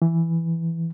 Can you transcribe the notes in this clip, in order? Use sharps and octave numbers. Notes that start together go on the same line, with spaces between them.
E3